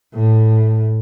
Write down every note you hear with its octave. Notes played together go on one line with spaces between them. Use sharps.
A2